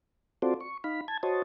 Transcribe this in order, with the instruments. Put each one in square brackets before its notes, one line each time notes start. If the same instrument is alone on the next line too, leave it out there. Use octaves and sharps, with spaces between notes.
[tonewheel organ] C4 F4 F#4 A4 C5 D5
C#6
D#4 F5 B5
A5 G#6
F#4 C5 C#5 D#5 A5